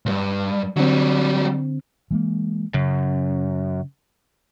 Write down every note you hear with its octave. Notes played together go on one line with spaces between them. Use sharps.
C#2 G2
D3 F#3 G3 C4
E3 G#3 A#3
F#2 C#3